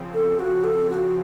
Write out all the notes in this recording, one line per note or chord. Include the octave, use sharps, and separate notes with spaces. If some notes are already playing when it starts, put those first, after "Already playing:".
Already playing: C#3 F3 C4
A4
F#4
A4
F#4